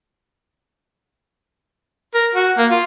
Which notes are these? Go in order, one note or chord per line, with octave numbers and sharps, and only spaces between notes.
A#4
F#4
A#3
F4